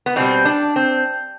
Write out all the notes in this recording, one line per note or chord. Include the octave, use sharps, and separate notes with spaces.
B3
B2 G3 C4
D4
C4